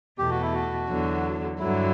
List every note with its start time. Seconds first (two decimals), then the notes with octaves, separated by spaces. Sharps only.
0.18 E2 B2 A3 G4
0.31 F#4
0.43 E4
0.54 F#4
0.89 E2 D3 F#3
1.59 G2 D3 F#3 E4